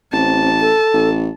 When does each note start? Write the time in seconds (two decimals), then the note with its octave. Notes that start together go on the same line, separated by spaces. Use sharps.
0.13 A1 C4 A5
0.60 A4
0.94 A1